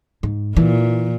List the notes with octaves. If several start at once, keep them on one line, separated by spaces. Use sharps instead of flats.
G#2
A#2 E3